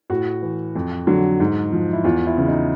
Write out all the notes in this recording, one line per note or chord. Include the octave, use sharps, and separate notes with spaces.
A2 F#4
E3
F2
D3 F#3
G#2
F3
E4
E2 F4
E4
C#3 E3
D#4